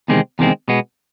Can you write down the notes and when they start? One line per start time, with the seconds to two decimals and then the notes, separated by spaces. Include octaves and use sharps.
0.08 E2 C3 D#3 G#3 C4
0.39 E2 C3 D#3 G#3 C4
0.68 B2 G#3 B3